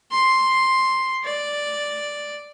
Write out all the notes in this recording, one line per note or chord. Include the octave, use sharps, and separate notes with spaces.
C6
D5